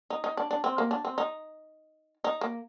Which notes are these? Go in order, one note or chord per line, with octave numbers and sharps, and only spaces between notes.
D#4
D#4
D4
D4
C4
A#3
D4
C4
D#4
D#4
A#3